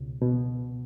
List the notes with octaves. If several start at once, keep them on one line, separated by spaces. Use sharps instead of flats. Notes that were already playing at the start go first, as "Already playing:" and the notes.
Already playing: C#2 B2
B2